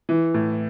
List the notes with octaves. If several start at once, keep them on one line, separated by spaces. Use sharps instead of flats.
E3
A2